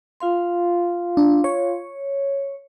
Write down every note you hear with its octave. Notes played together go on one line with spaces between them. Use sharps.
F4 F5 C6
D4
C#5